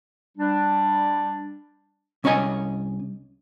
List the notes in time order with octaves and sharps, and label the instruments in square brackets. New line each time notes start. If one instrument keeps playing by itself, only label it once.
[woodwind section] G3 D4
[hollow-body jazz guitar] C2 C#4 C#5 D#5 G#5